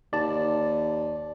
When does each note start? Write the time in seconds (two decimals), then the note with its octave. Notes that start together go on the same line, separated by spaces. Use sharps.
0.13 D#2 D5 A5